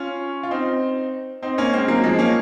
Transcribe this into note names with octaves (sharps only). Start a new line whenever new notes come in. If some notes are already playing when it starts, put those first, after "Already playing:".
Already playing: C#4 F4
F4
C4 D#4
C4 D#4
A#3 C#4
G#3 C4
F#3 A#3
F3 G#3
A#3 C#4